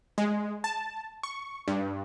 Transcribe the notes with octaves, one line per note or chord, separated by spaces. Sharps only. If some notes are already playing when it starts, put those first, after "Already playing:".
G#3
A5
C#6
G2